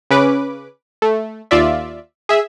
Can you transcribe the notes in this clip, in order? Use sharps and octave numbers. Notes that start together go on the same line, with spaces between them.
C#3 C#4 B4 D6
A3
D#2 F4 D5 E5
G#4 E5